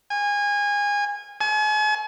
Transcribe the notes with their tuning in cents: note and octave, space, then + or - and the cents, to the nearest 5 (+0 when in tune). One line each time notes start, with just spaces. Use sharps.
G#5 -25
G#5 +40